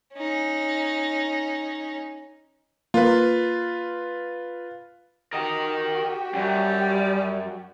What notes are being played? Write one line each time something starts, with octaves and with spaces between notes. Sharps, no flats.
C#4 D#4
A#3 F4 B4
F#4 G4 A#4 D#5
F#2 G3